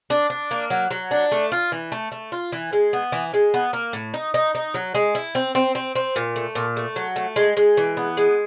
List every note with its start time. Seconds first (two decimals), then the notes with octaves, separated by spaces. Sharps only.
0.10 D4
0.30 D4
0.51 A#3
0.70 F#3
0.91 F#3
1.11 D4
1.32 A3
1.52 F4
1.72 E3
1.92 A3
2.12 A3
2.32 F4
2.52 E3
2.73 G#3
2.93 B3
3.12 E3
3.34 G#3
3.54 B3
3.73 A#3
3.93 A2
4.14 D#4
4.34 D#4
4.55 D#4
4.74 F#3
4.94 G#3
5.15 E4
5.35 C4
5.55 C4
5.75 C4
5.95 C4
6.16 A#2
6.36 A3
6.55 A#2
6.76 A3
6.96 F#3
7.16 A3
7.36 G#3
7.57 G#3
7.77 E3
7.97 B3
8.17 G#3